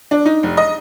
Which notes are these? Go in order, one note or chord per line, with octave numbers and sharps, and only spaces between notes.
D4
D#4
F1
D#5